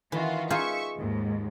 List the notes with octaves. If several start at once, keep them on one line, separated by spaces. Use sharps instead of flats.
D#3 E3 F4 F#4
D#4 F4 G#4 E5 C#6
D#2 G#2